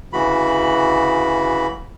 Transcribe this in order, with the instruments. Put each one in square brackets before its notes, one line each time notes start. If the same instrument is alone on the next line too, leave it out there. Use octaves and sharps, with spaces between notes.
[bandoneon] D2 C#3 E3 F#4 B5